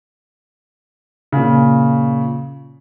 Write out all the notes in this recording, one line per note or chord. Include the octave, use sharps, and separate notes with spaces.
A#2 C#3